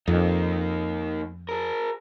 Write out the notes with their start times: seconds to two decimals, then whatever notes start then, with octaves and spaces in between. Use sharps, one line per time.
0.08 F2 A#3 D#4
1.49 G#4 A#4